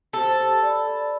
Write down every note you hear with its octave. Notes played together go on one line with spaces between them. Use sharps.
G4 A4 C5
D5 B5